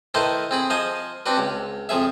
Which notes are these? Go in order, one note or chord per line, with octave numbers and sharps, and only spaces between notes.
D#3 A3 E4 B4 C5 D#5
C4 G#4 B5
F3 C5 D#5 G#5
C4 D4 F#4 B4
C#2
F2 F3 G#4 E5